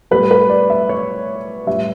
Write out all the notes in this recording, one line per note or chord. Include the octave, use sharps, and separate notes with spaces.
A2 G3 B4
B4
D5
E5
C#5
A2 G3 E5